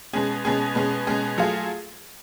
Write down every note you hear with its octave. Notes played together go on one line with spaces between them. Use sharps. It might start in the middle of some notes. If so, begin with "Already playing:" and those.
B2 G#3 C#4 G#4
B2 G#3 C#4 G#4
B2 G#3 C#4 G#4
B2 G#3 C#4 G#4
F#3 A3 F4 G#4